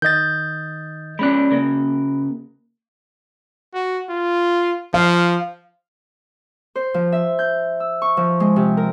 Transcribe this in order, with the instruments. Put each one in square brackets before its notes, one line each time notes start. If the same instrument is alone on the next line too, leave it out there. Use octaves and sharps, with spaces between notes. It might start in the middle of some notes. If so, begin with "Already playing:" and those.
[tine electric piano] D#3 D#5 [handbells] G6 A6
[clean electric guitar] G#3 C#4 D5 [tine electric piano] B5 F#6
[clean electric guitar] C#3 A#3
[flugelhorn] F#4
F4
[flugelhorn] F3 [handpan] F5
[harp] C5
F3
E5
G6
E6
C#6
F3
G#3
C3
A#4